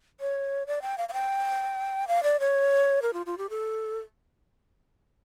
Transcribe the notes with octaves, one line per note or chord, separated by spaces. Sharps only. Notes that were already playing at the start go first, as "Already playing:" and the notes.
C#5
D5
G5
F5
F5
G5
F5
D5
C#5
A#4
F4
F4
G4
A4